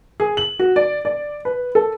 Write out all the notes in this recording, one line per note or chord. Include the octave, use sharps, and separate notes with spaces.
G#4
F#7
F#4
D5
D5
B4
A4